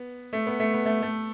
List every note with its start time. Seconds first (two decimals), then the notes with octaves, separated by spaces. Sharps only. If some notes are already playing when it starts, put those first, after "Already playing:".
Already playing: B3
0.33 A3
0.47 B3
0.60 A3
0.73 B3
0.86 A3
1.02 A3